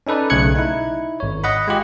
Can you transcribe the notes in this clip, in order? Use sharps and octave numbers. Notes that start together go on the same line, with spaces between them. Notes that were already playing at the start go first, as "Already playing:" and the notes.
C#4 D#4 A4 B4 D5
B1 C#3 A3 F#6 G#6 C#7
D#4 E4
G#1 C#5
D#5 F#5 B5
G#3 F4 G4 G#4